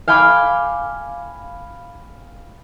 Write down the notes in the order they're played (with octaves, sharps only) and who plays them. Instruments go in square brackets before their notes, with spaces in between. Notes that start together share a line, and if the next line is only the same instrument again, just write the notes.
[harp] F5 G5 G#5 B5 D6